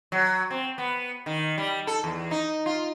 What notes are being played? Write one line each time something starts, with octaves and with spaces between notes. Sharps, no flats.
F#3
C4
B3
D#3
G3
A4
E2
D#4
F4